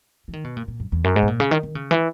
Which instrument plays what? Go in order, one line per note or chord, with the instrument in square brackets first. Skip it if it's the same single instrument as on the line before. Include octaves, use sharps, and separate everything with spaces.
[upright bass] E3
D#3
B2
A#2
A#2
F#2
E2
F#2
G#2
B2
A#2
C#3
D#3
D#3
C#3
E3